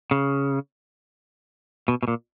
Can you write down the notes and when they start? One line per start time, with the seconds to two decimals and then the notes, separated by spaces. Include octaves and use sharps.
0.11 C#3
1.88 B2
2.03 B2
2.08 A#2